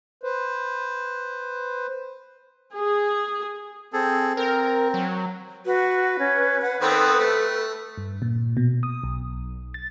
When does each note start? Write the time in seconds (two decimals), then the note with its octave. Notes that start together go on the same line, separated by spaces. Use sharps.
0.23 B4 C5
2.74 G#4
3.93 C4 G#4 A4
4.37 C4 A#4
4.94 F#3
5.66 F#4 B4
6.19 C#4
6.62 F#5
6.81 D#3 B3 C4 A4
7.19 A3 B4
7.98 G2
8.22 A#2
8.57 B2
8.83 D#6
9.04 B1
9.74 A6